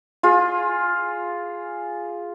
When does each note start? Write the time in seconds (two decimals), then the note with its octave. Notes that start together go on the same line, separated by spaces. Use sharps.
0.23 F4 G#4